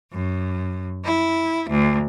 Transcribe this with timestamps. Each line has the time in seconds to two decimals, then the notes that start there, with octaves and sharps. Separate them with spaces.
0.12 F#2
1.03 E4
1.70 D2